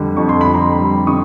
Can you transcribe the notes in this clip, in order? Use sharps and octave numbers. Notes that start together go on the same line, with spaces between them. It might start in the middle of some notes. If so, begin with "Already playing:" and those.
Already playing: F2 D3 G3
F2 C#6
C6
B5
F2
A#5 C6
G3
D3 C#6 D#6